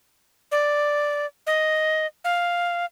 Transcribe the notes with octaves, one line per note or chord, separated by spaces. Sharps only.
D5
D#5
F5